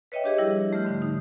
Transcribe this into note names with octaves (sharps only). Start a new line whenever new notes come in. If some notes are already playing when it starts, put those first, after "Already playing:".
B4 C#5 D#5 E5 G5
D4 G4 G#4
F3 G3 E4 G#4
A3 F6 G6
G#2 D3
D#4